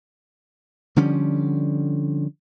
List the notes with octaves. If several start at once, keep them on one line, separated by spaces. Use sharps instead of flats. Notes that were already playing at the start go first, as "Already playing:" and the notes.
D3 F3 G3 C#4